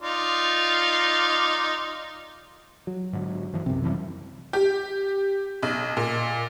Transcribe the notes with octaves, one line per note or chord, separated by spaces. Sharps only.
D#4 F4 D5
F#3
G#2 D3
G2 E3 F3
B1 F#2 C3
E3 F3 G3
G4
B1
A#2